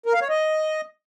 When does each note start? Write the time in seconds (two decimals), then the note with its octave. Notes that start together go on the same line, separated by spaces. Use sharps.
0.06 A#4
0.14 F5
0.21 C#5
0.29 D#5